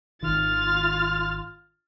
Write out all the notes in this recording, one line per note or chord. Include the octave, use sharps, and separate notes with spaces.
G#1 D#3 F4 F6 A6